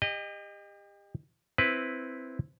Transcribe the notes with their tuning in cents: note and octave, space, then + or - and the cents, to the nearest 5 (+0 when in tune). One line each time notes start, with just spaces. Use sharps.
G4 +35 D#5 -20
C4 +0 E4 +0 B4 +0